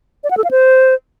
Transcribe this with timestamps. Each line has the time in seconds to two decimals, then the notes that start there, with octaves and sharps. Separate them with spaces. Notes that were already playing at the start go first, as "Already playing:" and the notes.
0.24 D5
0.31 F#5
0.37 A4
0.44 F5
0.51 C5